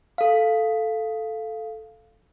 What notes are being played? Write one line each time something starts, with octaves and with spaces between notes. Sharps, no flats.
A4 F5